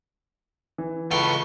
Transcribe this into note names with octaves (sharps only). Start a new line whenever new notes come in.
E3
C#2 A4 B4 F5 G5 C#6